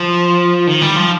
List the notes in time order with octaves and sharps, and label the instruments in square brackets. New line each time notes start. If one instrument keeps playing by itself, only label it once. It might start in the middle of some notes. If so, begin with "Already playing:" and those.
Already playing: [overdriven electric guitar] F3
D#3
G3
F3